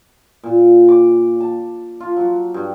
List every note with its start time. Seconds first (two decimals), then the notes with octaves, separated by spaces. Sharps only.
0.44 A#2
0.88 D6
1.40 A5
2.00 F4
2.17 F#3
2.54 G2